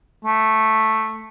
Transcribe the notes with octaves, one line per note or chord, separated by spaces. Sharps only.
A3